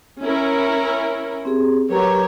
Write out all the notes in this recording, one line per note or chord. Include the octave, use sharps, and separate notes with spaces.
C#4 E4 A#4
C4 G4 G#4
F#3 G4 A#4 B4 C#5 A#5